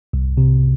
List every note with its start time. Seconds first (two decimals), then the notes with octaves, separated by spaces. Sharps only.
0.13 C2
0.37 C3